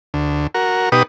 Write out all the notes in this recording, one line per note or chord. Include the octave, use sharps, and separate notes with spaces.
D2
F#4 A#4
B2 D#4 G4 B4 D#6